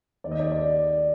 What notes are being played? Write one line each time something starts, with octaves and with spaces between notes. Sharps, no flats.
D#2 D#3 D5
D#5
D5
D5